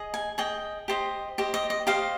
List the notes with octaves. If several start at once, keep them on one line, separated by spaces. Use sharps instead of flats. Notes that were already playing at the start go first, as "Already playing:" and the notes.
Already playing: G#4 D#5
G#5
G#4 D#5 G5
G4 C5 D#5
G4 C5 D#5
D#5
D#5
G4 C5 D#5 F5